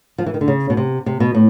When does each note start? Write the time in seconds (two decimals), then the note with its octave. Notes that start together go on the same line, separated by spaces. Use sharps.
0.18 F3
0.26 E3
0.34 D#3
0.41 D3
0.48 C#3
0.70 B2
0.77 C3
1.06 C3
1.20 B2
1.35 A2